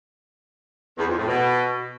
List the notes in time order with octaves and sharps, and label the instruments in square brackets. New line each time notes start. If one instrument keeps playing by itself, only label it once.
[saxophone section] E2
F2
A2
B2